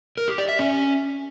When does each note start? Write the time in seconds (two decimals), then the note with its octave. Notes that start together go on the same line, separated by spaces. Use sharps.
0.17 A#4
0.28 G4
0.38 D5
0.49 E5
0.59 C#4